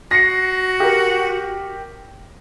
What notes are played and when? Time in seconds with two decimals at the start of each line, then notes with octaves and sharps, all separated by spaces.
0.11 F#4 A#6 C7 C#7
0.80 G4 A#4